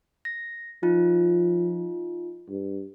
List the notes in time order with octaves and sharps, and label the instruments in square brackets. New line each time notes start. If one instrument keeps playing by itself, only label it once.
[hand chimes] A#6
[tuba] F3 [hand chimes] D#4 F4
[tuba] G2